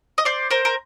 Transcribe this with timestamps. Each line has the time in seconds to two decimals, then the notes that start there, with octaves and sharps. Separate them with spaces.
0.18 D#5
0.25 C5 D5
0.51 A#4 C5
0.65 A#4